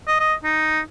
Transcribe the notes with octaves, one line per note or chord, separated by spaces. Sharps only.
D#5
D#5
D#4